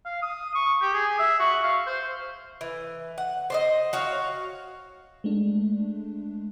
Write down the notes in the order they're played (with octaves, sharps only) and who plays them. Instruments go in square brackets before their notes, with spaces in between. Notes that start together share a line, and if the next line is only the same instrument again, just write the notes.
[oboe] F5
D#6
C#6
G4
G#4
E5
F#4
F5
C5
[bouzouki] E3
F#5
C5 D5 D#5
F#4 C#5 F5
[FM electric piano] G#3 A3 D4